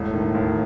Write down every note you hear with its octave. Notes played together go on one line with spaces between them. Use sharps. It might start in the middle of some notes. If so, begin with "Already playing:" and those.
Already playing: E1 A2
D#3
D#2